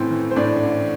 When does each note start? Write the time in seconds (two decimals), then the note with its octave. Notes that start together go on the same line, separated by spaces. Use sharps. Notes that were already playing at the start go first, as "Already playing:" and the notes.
Already playing: A1 A2 E3 C4 A4 C5
0.11 E3
0.31 C5
0.36 A2 D4 D5
0.63 A1